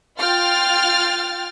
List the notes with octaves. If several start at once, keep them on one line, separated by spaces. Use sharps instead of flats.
F4 G5 F6 A6